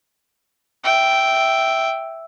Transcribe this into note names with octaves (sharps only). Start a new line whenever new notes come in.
E5 G5